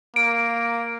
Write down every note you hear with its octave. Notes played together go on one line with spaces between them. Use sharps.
A#3 D7